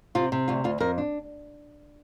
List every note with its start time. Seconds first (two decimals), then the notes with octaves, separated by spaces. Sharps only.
0.15 C3 F4
0.32 C3
0.48 D2 F4
0.64 D2 F4
0.80 F2 A#4
0.98 D4